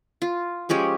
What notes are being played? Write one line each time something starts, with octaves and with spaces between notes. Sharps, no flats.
F4
F3 G#3 C#4 G4